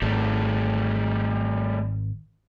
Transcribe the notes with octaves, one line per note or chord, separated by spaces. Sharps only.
G#1 G3 A3